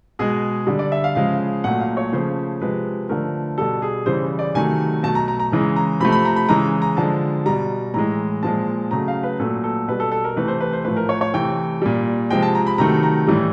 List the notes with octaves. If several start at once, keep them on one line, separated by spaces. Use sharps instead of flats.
B2 G#3 G#4
D3 G3
D5
E5
F5
C#3 F3 G#3 F5
A#2 F#3 A3 F#5
F5
C#5
C#3 F3 A3 C5
C3 F3 G#3 B4
D3 F3 A3 A#4
B2 G3 A4
G#4
C#3 E3 G3 C5
D5
C3 D#3 F#3 A3 G#5
B2 F#3 A3 A5
A#5
A#5
A#5
C#3 E3 G#3
A#5
C3 F3 A3 B5
B5
A#5
B5
C#3 E3 G#3 A#5
A#5
D3 F3 G#3 A5
B2 G3 A#5
A2 E3 G#3 A#5
A#2 F3 G#3 A5
C#3 F#3 A3 A#5
F5
B4
A#2 F#3 A3 A4
A4
B2 G3 B4
A4
A4
A#4
C3 E3 A3 B4
C5
B4
C5
A2 F3 A3 B4
A#4
C#5
C#5
C3 E3 A3 G5
A#2 G3
C3 F3 G#3 G5
A5
A#5
B5
C3 D#3 F#3 A3 A#5
A#5
A2 E3 G3